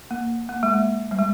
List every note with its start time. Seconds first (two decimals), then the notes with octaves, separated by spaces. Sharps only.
0.11 A#3
0.49 A#3
0.63 G#3
0.68 A#3
1.11 G3
1.19 G#3